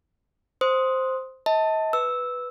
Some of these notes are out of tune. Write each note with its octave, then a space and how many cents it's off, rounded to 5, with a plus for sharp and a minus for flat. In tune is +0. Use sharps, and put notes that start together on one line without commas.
C5 +0 C6 +0 D#6 +10
D#5 +40 A5 +10
B4 +0 E6 -10